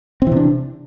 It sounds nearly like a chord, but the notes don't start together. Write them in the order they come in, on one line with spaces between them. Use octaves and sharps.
C4 E3 C3 D4